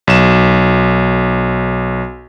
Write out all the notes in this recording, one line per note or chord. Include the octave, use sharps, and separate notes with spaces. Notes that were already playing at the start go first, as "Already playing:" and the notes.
B1 E7